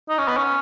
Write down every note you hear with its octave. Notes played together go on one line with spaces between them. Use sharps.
D#4
C#4
B3
C#4